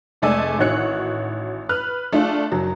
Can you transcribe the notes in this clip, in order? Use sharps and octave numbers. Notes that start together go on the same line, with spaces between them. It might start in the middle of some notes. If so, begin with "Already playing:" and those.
F1 G#3 A3 D5 G#5 E6
A1 D#3 F#4 C#5 F#6 C#7
B4 F6 F#6
A3 D4 F4 G#4
F#1 F#3